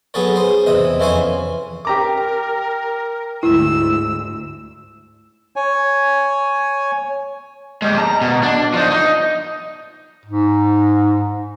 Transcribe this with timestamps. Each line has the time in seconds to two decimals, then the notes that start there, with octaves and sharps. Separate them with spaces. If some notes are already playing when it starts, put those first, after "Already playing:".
0.14 F#3 B3 G#4 A4 C#5
0.36 G#4 C5
0.66 E2 C3 D#5
1.00 F2 E3 C#4 C5 C#5 G#5
1.85 G4 A#4 A#5 D6
3.43 D2 G#2 E4 E6
5.56 C#5 G#5
7.82 G3 G#3
7.98 A5 A#5
8.21 B2
8.43 D4
8.74 F3 D#4
8.91 D#4
10.25 G#2